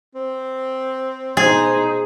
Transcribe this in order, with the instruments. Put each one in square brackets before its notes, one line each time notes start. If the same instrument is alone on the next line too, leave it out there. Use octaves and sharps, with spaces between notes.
[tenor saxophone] C4
[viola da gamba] B2 D#4 [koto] G#4 [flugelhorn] C5